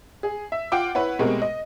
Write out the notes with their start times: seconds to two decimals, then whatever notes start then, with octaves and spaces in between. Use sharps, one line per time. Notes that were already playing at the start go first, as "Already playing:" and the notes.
0.23 G#4
0.52 E5
0.72 F4 F#5 G5 D6
0.95 E4 B4 C#5 F#5
1.19 B2 G#3 A3 C4 G4 A#4
1.42 D#5